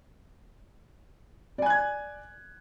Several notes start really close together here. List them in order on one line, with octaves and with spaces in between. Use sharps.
D5 G#5 F#6 G#6